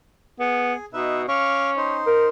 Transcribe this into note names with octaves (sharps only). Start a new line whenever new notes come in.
B3 G#4
B2 D#4 B4 E5
C#4 F5 C#6 D6
D#4 C5
A#4